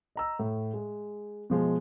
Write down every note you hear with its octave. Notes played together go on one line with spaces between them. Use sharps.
D#5 A#5 E6
A2
G#3
B2 F3 G#3